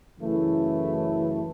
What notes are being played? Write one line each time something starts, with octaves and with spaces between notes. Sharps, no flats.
F#2 C#3 E3 A3 E4